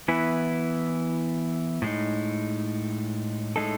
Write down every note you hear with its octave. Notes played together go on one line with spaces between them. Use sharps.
E3 B3 E4 B4
A2 G#3 D#4
A2 G#3 D#4 A4